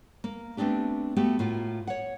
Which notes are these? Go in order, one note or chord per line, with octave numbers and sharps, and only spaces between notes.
A#3
A3 B3 C4 D4 G4
A3 B3 F#4 G4
A2 A#3 F4 F#4
C#5 F#5